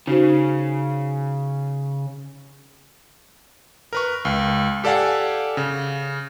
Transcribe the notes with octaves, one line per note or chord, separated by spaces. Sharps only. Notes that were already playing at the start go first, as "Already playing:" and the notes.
C#3 D#4 F#4 C5
A#4 B4 C#6
C#2
G4 A4 D5 F5 F#5 G#5
C#3